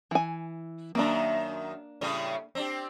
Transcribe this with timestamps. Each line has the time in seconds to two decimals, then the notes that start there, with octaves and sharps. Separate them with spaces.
0.11 E3 G#5
0.95 F#2 D#3 A#3 D4
2.01 A2 C#3 G3
2.55 C4 D4 G4